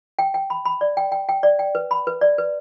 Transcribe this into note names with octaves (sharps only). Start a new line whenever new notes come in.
G5
G5
B5
B5
D5
G5
G5
G5
D5
G5
B4
B5
B4
D5
B4